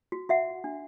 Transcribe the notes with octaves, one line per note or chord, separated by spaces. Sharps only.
F#4
F#4 E5 F#5
D4